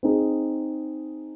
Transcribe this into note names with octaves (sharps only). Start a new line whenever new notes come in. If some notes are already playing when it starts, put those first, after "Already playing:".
C4 D#4 G#4